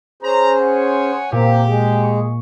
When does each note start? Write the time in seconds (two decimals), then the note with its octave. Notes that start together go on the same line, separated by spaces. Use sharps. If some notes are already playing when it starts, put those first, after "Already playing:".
0.23 C#4 G#4 C5 A#5
0.58 C#5 F#5 G#5
1.32 A#2 A#3 C4 G4
1.68 G#3 G#4
2.03 C#6